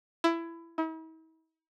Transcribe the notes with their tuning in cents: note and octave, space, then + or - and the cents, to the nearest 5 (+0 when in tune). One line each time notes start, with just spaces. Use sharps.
E4 +20
E4 -45